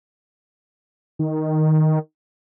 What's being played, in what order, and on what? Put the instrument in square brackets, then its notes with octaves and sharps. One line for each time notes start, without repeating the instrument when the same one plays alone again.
[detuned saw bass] D#3